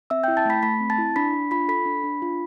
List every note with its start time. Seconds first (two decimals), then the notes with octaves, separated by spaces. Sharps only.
0.10 C4 E5 E6
0.23 E4 G5 G6
0.37 A5 A6
0.45 A3 B5 B6
0.63 A3 B5 B6
0.80 C4
0.90 A5 A6
0.98 E4
1.16 D4 B5 B6
1.33 D4
1.51 F4 B5 B6
1.68 A4 B5 B6
1.86 D4
2.04 D4
2.22 F4